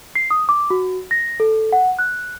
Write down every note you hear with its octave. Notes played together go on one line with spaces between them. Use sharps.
C7
D#6
D6
F#4
A#6
A4
F#5
F#6